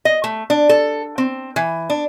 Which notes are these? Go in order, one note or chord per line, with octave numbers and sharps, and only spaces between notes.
D#5
A3
D4
A4
C4
E3
D4